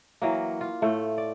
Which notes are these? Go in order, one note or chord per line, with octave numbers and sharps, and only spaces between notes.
E3 F#3 A#3
F4
A2 A3
D5